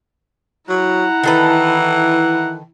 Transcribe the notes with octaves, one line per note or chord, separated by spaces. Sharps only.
F#3 E4 F#5 A#5
D#3 E3 A4 B4